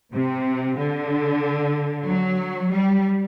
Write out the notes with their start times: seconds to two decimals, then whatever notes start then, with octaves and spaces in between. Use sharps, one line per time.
0.14 C3
0.78 D3
2.07 F#3
2.72 G3